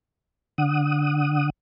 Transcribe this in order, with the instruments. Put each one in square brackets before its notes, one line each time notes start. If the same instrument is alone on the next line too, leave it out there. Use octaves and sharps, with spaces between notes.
[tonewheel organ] D3 F#5 D#6